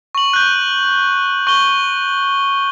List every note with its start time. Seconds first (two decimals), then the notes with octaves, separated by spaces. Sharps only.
0.15 C#6 F#7
0.33 F#6 G6
1.47 C#6 G7